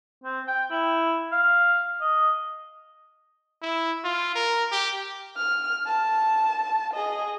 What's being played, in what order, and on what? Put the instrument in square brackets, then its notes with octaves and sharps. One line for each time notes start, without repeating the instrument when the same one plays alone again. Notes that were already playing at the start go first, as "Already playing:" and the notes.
[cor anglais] C4
G5
E4
F5
D#5
[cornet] E4
F4
A#4
G4
[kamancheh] F6
A5
G#4 D#5